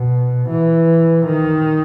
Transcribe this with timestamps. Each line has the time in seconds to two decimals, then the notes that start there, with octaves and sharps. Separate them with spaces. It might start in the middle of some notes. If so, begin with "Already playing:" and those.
Already playing: B2
0.49 E3
1.25 D#3